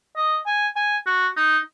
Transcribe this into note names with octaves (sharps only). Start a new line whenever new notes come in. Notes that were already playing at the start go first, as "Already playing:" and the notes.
D#5
G#5
G#5
F#4
D#4